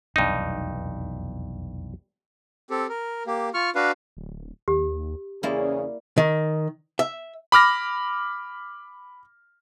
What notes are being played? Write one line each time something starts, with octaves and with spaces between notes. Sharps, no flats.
F1 B1 E2 G2 D#4
C4 G4 A4
A#4
A#3 G4
F4 C#6 F6
D4 F#4 B4 F5
D1
D#2 G4
E2 C#3 A#3 C#4 E4 G#4 D5
D#3
E5
B5 D6 F6 A#6